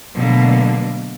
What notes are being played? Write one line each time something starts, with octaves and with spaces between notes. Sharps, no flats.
B2 D3 F#3 A3 A#3